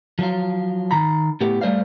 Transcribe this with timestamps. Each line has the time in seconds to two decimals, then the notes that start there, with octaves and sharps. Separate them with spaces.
0.19 F3 F#3 F4
0.91 D#3 A#5 B5
1.41 A2 A3 B3 G4
1.61 G3 A3 C5 D5 F5